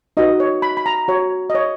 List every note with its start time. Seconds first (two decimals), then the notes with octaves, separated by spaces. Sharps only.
0.17 D#4 F#4 B4 D#5
0.40 C#5
0.62 B5
0.77 B5
0.86 A#5
1.08 F#4 C#5
1.50 D#5
1.55 C#5